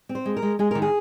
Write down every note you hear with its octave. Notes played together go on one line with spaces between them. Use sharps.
C4
C5
G#3
A#4
G#3
G#3 G#4
D#3 A#4
G#4